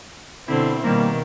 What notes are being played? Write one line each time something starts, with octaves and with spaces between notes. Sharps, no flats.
B2 D3 C4 E4
B2 D#3 G3 A#3